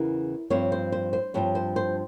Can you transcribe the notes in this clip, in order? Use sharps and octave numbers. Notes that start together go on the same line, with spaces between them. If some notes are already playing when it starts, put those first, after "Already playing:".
Already playing: E2 C#3 E3 A#4
G2 F3 C4 C#5
C5
C5
C5
G2 F3 C4 C#5
C5
C5